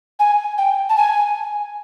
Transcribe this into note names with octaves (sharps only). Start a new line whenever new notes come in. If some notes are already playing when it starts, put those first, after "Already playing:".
G#5
G5
A5
G#5